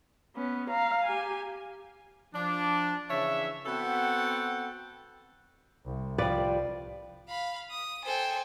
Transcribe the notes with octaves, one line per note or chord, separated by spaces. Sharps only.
B3 C#4
F5 A#5
G4 G#5
F3 D4
C#3 E3 D4 C#5 E5
B3 C4 F#4 A4 F#5 G5
C2
F3 G3 B4 D5
F5 B5
D#6
A4 C5 G5 G#5